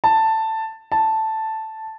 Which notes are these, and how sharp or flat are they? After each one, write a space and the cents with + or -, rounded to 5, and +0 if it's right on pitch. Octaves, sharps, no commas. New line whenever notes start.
A5 +10
A5 +0